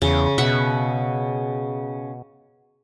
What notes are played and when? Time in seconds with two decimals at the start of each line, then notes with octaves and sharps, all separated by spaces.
0.02 E2 C#3
0.38 B2 E5 F#5